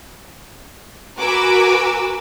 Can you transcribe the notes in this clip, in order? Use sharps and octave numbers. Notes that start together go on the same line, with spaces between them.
F#4 A#4 B4 G#5 D6 E6